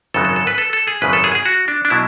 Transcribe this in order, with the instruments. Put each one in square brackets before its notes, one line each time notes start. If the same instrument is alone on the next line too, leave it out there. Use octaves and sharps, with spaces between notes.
[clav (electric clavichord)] G#1 F#2 C#3 F#3 A4
A4
A4
B4
A4
A4
G#4
G#1 F#2 C#3 B4
A4
G#4
G#4
F#4
D4
D4
B2 F#3 E4